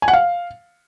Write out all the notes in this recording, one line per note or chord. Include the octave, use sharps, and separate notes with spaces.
G#5
F#5
F5